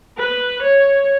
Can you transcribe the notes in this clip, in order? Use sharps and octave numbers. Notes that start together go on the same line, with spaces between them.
B4
C#5